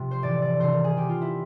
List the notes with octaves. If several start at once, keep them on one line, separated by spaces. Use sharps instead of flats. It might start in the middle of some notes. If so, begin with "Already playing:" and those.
Already playing: C3 F3
C5
A2 E3 D5
D5
C3 D#3 C5
A#4
G#4
B2 G4
F4
E4